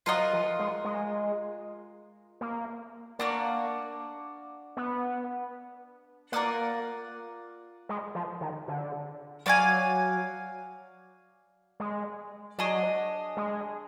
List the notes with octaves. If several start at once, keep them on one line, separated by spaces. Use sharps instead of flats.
F#3 F4 A#4 D#5 F#5
F3
G#3
G#3
A#3
A#3 D4 F#4 A#4 D5
B3
A#3 F4 A#4 D5 F#5
G#3
F3
D#3
D3
F#3 F#4 D5 F5 G#5
G#3
F#3 D4 G#4 D#5
G#3